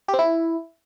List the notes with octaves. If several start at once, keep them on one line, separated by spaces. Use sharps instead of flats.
G4
C4
E4